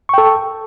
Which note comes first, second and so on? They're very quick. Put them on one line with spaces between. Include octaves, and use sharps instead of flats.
C#6 G5 A4